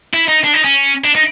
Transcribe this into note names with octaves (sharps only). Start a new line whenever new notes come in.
E4
D#4
D4
D#4
C#4
D4
D#4